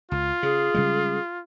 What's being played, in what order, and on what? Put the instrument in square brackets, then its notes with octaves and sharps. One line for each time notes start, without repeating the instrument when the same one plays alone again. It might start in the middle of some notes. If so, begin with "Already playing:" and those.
[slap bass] C#2 [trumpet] F4
[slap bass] C#3 [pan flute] G#4
[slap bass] C#3 G3 G#3